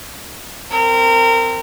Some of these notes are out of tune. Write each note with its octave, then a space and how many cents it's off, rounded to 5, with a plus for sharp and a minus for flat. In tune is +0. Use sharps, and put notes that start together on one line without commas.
C4 +0 A#4 -25